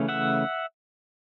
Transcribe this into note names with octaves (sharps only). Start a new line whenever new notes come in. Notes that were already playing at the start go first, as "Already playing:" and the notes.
Already playing: C#3 E3 A3 C#4
E5 F#5